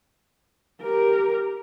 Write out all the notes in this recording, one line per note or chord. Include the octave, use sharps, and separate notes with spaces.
G4 A#4